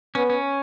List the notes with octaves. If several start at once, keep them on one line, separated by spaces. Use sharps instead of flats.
B3 C#4
C#4